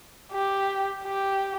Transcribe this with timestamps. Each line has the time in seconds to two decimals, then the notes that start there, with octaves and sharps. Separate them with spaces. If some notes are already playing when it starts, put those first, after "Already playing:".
0.32 G4
1.05 G4